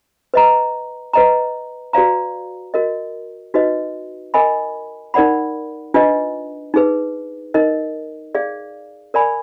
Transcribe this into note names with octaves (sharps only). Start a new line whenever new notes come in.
B4 D#5 A#5
B4 D#5 A#5
F#4 B4 D5 F5 A#5
F#4 A#4 D#5
D#4 F#4 B4 D#5
A#4 D#5 G#5 B5
D#4 A#4 D5 F#5 B5
D4 F4 B4 D#5
D#4 G#4 B4
D#4 A#4 D#5
G#4 D5 F5
A#4 D5 G#5 B5